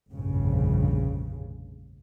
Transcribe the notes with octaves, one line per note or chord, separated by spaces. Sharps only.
F1 A#1 G2 C#3